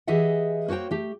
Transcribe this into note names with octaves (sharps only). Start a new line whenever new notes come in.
E3 G4 G#4 D#5 E5 F#5
A#3 F#4 C5 C#5 G5
A3 G4